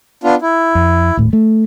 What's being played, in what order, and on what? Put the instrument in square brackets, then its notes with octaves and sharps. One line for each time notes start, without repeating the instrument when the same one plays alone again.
[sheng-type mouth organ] B3 D4 F4
E4
[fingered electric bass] F2
D#1 A2
A3